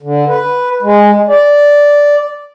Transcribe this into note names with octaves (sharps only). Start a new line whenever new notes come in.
D3
B4
G#3
D5